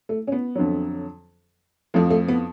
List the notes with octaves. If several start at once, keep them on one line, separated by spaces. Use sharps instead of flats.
A3
C#4
B3
F2 D3 F#3
F2 F3 A3
A3
B3